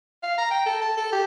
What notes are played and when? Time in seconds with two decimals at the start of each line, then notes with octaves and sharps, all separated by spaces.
0.23 F5
0.38 A#5
0.51 G5
0.66 A4
0.82 A5
0.97 A4
1.12 G4